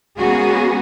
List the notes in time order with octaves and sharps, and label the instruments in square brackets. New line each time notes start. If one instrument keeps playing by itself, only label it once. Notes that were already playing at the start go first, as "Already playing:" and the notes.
[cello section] G#3 A#3 B3 C#4 F#4 G#4